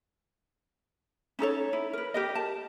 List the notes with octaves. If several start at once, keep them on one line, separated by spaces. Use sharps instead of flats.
C#4 D#4 A4 C#5
E4
A#4 B4
G4 A#4 D#5
A5